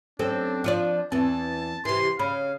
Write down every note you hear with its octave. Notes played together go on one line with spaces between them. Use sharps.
F#2 C4 D4 A4
F3 F4 D5
E2 E3 C4 A5
C3 E3 C6
C#3 F5 B5